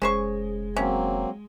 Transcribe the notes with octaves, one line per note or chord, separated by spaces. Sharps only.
F1 G#3 C#4 C5 C#6
F#3 A#3 C4 C#4